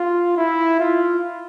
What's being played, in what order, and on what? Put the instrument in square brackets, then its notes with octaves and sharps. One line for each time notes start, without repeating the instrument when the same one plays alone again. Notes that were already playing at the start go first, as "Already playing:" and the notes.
Already playing: [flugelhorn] F4
E4
F4